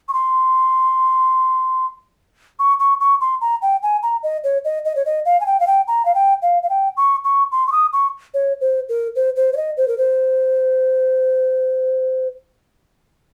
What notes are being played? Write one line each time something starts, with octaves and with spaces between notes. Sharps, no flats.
C#6
C6
C#6
C#6
C#6
C6
A#5
G5
G#5
A#5
D#5
C#5
D#5
D#5
C#5
D#5
F5
G#5
G5
F5
G5
A#5
F5
G5
F5
F5
G5
C#6
C#6
C6
C#6
D#6
C#6
C#5
C5
A#4
C5
C5
C#5
D#5
C5
A#4
C5